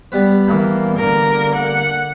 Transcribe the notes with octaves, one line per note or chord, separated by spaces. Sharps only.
G3 B3 B4
E3 A#3
D3 A#3 A#4
F#5